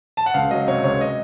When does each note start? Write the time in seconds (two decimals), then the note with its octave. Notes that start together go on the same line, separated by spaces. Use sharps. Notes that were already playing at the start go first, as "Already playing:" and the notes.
0.17 A5
0.26 F#5
0.34 C#2 F5
0.51 F#3 D#5
0.67 C3 C#5
0.84 C#2 C#5
1.01 D#5